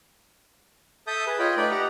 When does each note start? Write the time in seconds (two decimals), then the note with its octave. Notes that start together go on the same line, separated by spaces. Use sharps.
1.07 A4 E5 A5 D#6 G6
1.27 G#4 B4
1.39 F4 C#5 D#5 G5 B5
1.57 A3 D#4 B4 D5 G5
1.71 D#4 G4 F#5 A#5